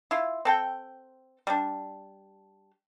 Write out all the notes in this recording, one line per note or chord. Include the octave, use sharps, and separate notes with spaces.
E4 F4
C4 A4 G5
G3 D4